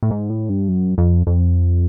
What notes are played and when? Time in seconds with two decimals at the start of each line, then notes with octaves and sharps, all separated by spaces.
0.03 A2
0.11 G#2
0.30 A2
0.49 G2
0.68 F#2
0.98 F2
1.27 F2